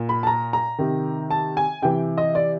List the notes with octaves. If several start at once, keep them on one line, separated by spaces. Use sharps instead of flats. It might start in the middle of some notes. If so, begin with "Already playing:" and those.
Already playing: A#2
B5
A5
A#5
A#5
C3 D#3
A5
G#5
C3 E3 G5
D#5
D5